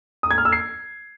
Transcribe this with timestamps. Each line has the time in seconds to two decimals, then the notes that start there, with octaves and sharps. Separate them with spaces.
0.23 D#6
0.31 G#6
0.38 F6
0.45 E6
0.52 C7